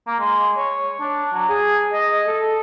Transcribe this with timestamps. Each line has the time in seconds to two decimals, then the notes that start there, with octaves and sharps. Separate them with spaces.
0.07 A#3
0.20 G#3
0.57 C#5
1.01 D4
1.33 F#3
1.49 G#4
1.93 D#5
2.27 A4